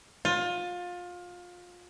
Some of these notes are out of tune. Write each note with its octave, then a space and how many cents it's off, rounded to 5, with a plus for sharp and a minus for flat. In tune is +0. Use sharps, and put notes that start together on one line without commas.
F4 +25